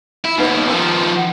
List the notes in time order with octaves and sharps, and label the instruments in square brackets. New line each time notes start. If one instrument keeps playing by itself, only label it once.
[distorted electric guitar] E4
[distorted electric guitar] D#2 B2 [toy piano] D#4 B4
[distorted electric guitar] D#3 F3 [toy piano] C#4 C6 E6
[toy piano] F#5 G5